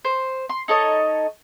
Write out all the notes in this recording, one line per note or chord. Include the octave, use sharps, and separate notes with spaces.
C5
C6
D#4 A4 C#5 D#5